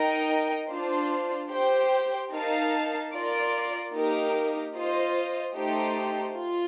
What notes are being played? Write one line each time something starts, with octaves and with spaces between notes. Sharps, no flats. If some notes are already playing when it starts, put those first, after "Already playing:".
Already playing: D#4 A#4 D#5 G5
D4 F4 C5
G4 C5 G5
D#4 A#4 F5 A5
F4 A#4 D5
A#3 D#4 G4 A#4
F4 C5 D#5
A3 D#4 G4 C5
F4